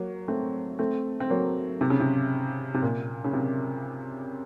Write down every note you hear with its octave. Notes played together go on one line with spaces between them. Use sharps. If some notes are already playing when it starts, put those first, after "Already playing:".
Already playing: F#3 A#3
A3 C4
A3 C4
C4
F#3 A#3
C3
C#3
C3
C3
A#2
C#3
C3